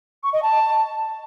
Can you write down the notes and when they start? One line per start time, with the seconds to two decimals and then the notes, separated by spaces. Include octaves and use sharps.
0.23 C#6
0.33 D#5
0.43 A5